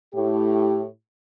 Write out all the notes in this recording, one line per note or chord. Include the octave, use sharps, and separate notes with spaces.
A2 G4